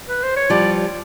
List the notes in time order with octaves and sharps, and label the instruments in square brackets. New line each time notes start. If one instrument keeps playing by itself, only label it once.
[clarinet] B4
C5
C#5
[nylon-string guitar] F3 G3 [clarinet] D5